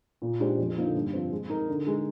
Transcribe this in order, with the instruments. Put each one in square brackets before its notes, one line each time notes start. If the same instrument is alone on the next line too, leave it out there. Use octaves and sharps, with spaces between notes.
[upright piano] A#2
G#3 D4 G4 C5
F2
D3 F3 A#3 D#4
G2
F3 C4
G#3
D#4 A#4
D3
G#3 D#4